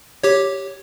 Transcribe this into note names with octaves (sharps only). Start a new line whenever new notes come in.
G4 C#5